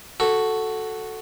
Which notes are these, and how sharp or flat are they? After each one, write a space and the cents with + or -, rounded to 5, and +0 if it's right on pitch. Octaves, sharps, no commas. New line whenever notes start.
F#4 +0 A4 +0